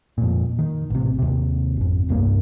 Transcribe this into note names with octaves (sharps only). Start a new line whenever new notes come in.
F2 A#2
D#3
A1 C3
D#2 C3
G#1 F2
E1 C2 G2 A#3